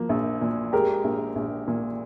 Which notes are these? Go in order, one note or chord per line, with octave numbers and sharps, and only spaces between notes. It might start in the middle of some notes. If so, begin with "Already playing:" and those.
Already playing: F3 A#3
A#1
A#2
G#3 G4 A#4
A#1
A#1
A#2